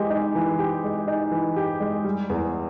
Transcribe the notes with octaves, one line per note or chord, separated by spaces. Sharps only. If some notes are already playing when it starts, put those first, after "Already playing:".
Already playing: E3 G#3 G4
D#4
E3
G4
G#3
D#4
E3
G4
G#3
G3
E2